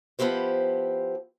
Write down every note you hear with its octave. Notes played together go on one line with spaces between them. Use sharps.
F3 B3 E4 G4 C5